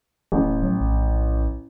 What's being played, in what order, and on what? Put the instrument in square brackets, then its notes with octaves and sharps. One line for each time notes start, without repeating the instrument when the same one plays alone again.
[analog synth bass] D1 [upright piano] A1
[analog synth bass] F#3
A#1